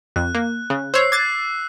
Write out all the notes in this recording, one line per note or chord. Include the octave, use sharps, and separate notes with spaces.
F2 F#6
A#3
C#3
C5 C#5 E6 C7
D6 F#6 G#6 A6 C7